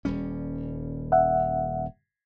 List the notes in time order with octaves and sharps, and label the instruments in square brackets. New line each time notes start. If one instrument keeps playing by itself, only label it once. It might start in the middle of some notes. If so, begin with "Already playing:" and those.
[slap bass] D#1 G3 C#4
[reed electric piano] E5 F#5